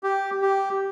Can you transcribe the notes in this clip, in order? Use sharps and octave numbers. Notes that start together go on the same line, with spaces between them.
G4
G4